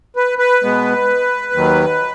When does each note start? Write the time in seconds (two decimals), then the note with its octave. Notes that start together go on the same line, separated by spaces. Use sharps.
0.16 B4
0.39 B4
0.62 B2 G#3 B3
1.53 D#2 D#3 F#3